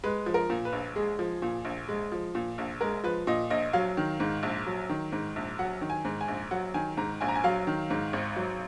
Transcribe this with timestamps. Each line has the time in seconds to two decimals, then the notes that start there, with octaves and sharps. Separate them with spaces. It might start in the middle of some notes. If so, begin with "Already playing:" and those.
0.04 G#3 B4
0.26 F3
0.34 A#4
0.50 A#2
0.65 B4
0.73 A#1
0.96 G#3 G#4
1.19 F3
1.42 A#2
1.65 A#1
1.88 G#3
2.12 F3
2.35 A#2
2.58 A#1
2.81 G#3 A#4
3.04 F3 B4
3.27 A#2 D#5
3.50 A#1 D#5
3.73 F#3 F5
3.97 D#3
4.20 G#2
4.43 A#1
4.66 F#3
4.89 D#3
5.12 G#2
5.36 A#1
5.59 F#3 F#5
5.81 D#3
5.90 G#5
6.05 G#2
6.21 G#5
6.28 A#1
6.51 F#3 F#5
6.74 D#3 G#5
6.97 G#2 A#5
7.21 A#1 G#5
7.28 A#5
7.36 G#5
7.44 F#3 F5
7.67 D#3
7.90 G#2
8.13 G#1
8.36 F#3